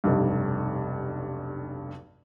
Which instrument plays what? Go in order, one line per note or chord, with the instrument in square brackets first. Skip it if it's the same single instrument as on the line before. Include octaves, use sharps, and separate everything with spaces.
[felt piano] F1 B1 G2